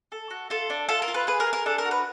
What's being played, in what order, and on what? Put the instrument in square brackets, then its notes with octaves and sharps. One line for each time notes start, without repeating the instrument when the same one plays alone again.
[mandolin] A4
F#4
F4 A4
D4
F4 A4
A#4
F4
B4
G#4 B4
A#4
G#4
A#4
D4 A4
A#4
F#4
B4